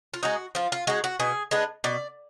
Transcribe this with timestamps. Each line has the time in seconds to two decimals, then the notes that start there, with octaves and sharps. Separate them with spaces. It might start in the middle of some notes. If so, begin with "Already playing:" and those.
0.14 F4
0.23 G#3 D#4 F#4
0.55 F3 F4
0.72 F4
0.87 G#3 D#4 F#4
1.04 F#4
1.20 B2 G#4
1.51 G#3 B3 D4
1.84 B2 D5